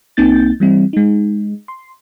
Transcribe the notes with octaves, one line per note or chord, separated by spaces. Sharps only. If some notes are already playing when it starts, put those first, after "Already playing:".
C2 A#3 C4 D#4 G6 A6
E3 G3 C4
G#3 D#4
C6